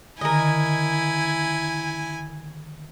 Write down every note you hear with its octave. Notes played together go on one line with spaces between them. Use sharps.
D3 D#3 E4 A#4 D#5 G#5